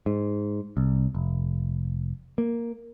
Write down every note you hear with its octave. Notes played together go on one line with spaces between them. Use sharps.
G#2
C2
F1
A#3